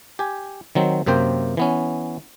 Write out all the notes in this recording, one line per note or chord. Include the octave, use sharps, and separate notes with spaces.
G4 G#5
D#3 F#3 C4
F#2 C3 A#3 C5 G5
E3 B3 C#4